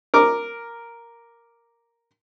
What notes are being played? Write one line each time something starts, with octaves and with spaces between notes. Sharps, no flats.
A#4 D6